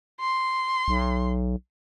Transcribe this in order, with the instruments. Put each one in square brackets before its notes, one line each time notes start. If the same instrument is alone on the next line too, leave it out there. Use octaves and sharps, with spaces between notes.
[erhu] C6
[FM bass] B1